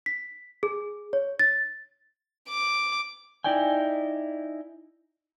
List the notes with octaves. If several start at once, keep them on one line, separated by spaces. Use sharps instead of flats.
B6
G#4
C#5
A6
D6
D#4 E4 D5 G5 G#5